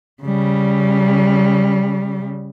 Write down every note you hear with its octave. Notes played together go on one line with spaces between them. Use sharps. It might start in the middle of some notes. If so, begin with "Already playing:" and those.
C#3 G3